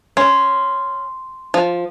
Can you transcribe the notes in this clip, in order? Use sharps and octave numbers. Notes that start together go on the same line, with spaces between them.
C#4 C6
F3